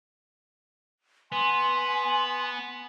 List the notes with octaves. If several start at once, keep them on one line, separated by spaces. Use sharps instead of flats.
B3 G#5 C6